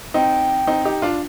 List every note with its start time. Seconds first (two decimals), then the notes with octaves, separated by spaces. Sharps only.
0.14 C4 D#4 G5
0.67 C4 D#4
0.85 D#4 G4
1.02 D4 F4